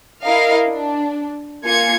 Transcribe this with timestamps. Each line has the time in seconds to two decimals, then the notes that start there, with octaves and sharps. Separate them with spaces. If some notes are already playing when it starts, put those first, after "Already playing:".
0.22 E4 A#4 D#5 F5
0.66 D4
1.64 A#3 F4 G#5 G#6 C#7